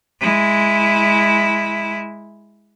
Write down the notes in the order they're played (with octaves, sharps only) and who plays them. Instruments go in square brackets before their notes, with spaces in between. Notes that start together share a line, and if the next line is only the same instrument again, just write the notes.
[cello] G#3 E4